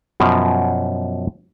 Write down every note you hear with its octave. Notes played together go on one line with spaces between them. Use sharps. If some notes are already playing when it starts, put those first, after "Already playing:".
F#2 B2 F3